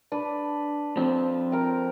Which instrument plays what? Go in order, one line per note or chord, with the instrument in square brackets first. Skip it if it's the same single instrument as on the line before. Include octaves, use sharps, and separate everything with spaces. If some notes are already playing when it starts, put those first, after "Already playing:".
[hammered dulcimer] D4 B4
[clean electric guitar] F3 C4
[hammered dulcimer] A#4 G5